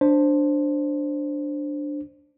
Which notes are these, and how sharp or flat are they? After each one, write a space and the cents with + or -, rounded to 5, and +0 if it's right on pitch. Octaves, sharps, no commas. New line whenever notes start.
D4 +0 C5 +5